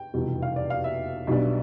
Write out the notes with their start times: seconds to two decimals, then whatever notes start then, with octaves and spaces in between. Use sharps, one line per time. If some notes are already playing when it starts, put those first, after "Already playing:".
Already playing: G5
0.14 F1 E2 B2 G3
0.42 F5
0.56 D5
0.70 F5
0.84 E5
1.27 B1 B2 G3 D4